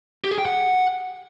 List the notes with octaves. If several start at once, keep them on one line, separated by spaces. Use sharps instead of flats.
G4
G#4
G5
F#5